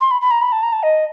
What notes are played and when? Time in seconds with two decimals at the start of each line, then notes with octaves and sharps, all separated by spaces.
0.01 C6
0.11 B5
0.21 B5
0.31 A#5
0.42 B5
0.52 A5
0.63 A#5
0.73 A5
0.83 D#5